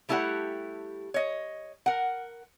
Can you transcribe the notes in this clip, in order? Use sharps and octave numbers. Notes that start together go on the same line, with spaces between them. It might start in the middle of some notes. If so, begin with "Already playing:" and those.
G3 A3 E4 G4 B4 F#5
C#5 D#5
A#4 F#5